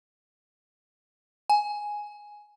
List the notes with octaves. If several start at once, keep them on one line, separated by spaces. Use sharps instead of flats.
G#5